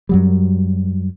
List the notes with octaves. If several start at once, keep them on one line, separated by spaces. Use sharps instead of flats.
F#2 F#3 G3